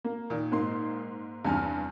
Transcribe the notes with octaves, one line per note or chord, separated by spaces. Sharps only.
A#3
A#2 D#3
G#2 A#3 C6
E2 G2 C3 G#5 F6